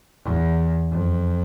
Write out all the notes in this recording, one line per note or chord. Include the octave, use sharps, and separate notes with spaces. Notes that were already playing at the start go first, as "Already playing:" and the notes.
E2
F2